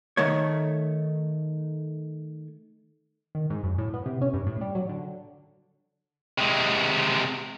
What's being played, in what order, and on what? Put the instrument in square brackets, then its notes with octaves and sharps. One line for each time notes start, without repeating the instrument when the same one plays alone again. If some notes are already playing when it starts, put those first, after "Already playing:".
[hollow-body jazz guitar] D#3 A3 C#5
[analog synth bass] D#3
G#2
F#2
A2
B3
C3
C#4
G2
A2
G3
F#3
D3
[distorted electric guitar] C3 G#3